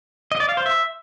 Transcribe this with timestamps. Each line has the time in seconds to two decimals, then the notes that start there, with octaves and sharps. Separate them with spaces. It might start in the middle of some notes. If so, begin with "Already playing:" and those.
0.32 D#5
0.40 D5
0.49 F5
0.57 C5
0.66 E5